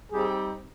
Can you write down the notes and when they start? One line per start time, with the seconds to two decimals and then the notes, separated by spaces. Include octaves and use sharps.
0.12 G3 C4 D#4 G4 G#4